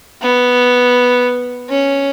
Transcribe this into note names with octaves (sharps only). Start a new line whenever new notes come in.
B3
C#4